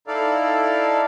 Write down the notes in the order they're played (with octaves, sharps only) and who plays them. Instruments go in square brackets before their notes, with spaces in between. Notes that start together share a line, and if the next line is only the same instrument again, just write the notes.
[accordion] D#4 E4 A4 D5 F5